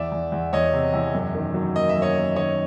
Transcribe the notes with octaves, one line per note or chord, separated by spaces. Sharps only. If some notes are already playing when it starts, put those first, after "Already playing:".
Already playing: E2 D5 E5
E2
E2
E2 C#5 D#5
C3
E2
F#2
D#3
F#3
A#3 D#5
E5
F#2
C#5 D#5
A#3
D#3 C#5 D#5